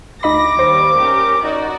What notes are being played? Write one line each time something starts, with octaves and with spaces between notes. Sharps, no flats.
D2 D#4 D#5 B5 D6 A#6
D#2 G3 A#3 C5
C#4 G4 A#4
D#4 F#4 D5